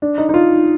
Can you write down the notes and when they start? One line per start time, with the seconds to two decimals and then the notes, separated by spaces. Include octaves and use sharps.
0.02 D4
0.18 D#4
0.29 D#4
0.34 F4